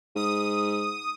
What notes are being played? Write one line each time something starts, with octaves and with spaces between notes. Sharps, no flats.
G#2 D#6